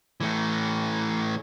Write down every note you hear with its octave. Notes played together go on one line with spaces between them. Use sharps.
E3 A3